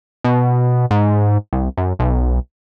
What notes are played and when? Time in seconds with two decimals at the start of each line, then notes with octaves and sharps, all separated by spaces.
0.24 B2
0.91 G#2
1.53 C2
1.77 F#2
1.99 B1